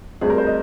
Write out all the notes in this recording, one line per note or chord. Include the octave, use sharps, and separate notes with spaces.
D2 C3 G3 C4 G#4
A#4
C5
D#5